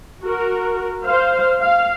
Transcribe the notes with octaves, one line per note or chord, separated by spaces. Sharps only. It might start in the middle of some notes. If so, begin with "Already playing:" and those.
F#4 A#4
C5 F5
F5